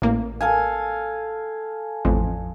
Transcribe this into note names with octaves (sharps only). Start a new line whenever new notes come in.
A1 A#3
A4 F5 G#5
A1 F2